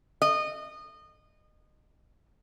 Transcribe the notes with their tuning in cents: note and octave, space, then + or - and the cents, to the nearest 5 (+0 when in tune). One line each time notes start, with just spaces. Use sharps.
D#5 -25